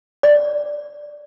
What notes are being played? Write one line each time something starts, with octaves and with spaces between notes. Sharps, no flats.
D5